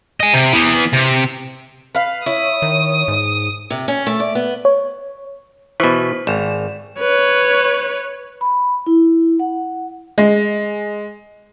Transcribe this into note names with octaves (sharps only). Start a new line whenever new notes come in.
D#5 G#5
C3
E3 B3
C3
B4 F5
E4 C#5 D#6
D#3
G#2
C3
C#4
A3
D5
B3
C#5
B2 E3 C5 C#6 B6
G#1 D5 E7
B4 C#5
B5
E4
F#5
G#3